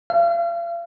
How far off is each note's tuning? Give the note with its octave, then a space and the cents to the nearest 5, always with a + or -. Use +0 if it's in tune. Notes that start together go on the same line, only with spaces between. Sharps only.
F5 -40